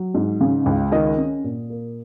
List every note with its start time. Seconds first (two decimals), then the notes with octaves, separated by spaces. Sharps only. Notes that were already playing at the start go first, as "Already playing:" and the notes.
Already playing: F#3
0.14 G#2
0.41 C#3
0.66 C#2
0.92 D#3 D#5
1.18 C#4
1.44 A#2
1.70 A#3